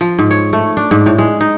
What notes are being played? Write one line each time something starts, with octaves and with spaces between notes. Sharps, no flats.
F3
G#2
C#5
A3
D4
G#2
A2
G#3
D#4